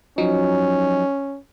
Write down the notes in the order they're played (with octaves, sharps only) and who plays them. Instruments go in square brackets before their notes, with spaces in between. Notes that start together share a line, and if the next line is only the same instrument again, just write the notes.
[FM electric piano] F3 F#3 D#4 [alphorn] C#4